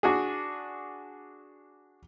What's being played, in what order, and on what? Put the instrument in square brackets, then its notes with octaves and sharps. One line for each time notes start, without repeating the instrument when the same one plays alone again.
[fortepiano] D4 F#4 G#4